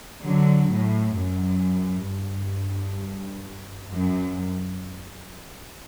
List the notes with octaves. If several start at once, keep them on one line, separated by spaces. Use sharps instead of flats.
D3 F#3
A2
F#2
G2
F#2